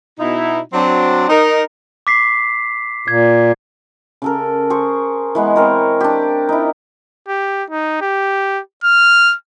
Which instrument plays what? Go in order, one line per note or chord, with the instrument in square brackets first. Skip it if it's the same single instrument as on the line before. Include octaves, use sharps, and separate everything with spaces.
[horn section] B2 D#4 E4
F#3 C4 D4
D#4 A#4
[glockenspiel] D6 B6 C7
[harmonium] A#2 [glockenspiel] G#6
[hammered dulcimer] C#3 A4 A#4
G#4 C5 C#6
E3 G#3 B3
C4 A#4 C#5
D4 G4
D#4 E4
[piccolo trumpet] G4
D#4
G4
F6